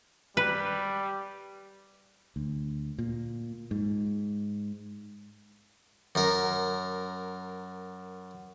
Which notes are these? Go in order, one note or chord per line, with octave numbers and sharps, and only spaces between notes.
G3 B4
D2
A#2
G#2
F#2 A#4